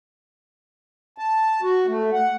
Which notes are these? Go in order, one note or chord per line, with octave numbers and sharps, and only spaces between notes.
A5
F#4
A3
F#5